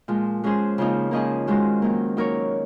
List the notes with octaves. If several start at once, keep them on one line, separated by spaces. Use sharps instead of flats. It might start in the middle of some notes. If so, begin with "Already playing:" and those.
A#2 F3 G#3
G#3 C#4 G#4 C5
C#3 F3 A#3 D#4
F3 A#3 C#4 G#4 D#5
D#3 G#3 C#4 F#4 C5
D#3 F#3 A#3
F#3 A#3 D#4 A#4 C#5